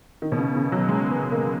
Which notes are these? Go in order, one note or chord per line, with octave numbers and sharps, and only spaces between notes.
D#3
B2
C#3
C#3
F#3
G#3
B3
A#3